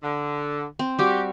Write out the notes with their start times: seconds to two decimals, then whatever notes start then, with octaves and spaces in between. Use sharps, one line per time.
0.03 D3
0.79 C4
0.99 G3 F#4 G4